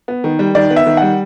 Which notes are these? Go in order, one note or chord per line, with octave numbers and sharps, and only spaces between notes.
B3
D#3
G3
D#3 D5
B3
E5
D#3
G3 F#5